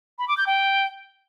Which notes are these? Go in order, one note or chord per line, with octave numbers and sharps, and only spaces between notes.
B5
D6
G6
G5